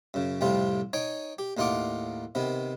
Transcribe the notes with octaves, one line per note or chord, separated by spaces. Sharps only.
F#2 C#3
F2 A2 C3 G3 F4
D#4 C#5 G5 G#5
G4
D#2 A2 D#4 F4 F#5 D6
C3 D#3 B3